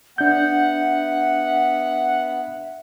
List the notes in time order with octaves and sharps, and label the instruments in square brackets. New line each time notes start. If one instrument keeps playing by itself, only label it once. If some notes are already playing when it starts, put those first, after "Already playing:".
[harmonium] B3 [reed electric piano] D4 G6 [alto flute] E5 [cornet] F#5